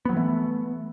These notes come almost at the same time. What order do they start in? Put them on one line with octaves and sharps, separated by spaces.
B3 F#3 E3 A3